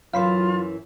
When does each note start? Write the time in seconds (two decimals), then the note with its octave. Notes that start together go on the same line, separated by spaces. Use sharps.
0.14 F#2 E3 F#3 F4 F5 B5 C6